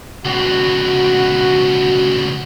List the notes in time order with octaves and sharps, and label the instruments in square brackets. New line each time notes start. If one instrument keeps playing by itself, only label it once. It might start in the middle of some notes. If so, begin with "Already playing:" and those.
[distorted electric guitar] C#2 B2 [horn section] F#4